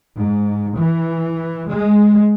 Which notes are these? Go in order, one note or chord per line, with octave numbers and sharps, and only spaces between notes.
G#2
E3
G#3